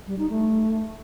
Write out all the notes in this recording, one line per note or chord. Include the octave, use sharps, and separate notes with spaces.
G3
D#4
A3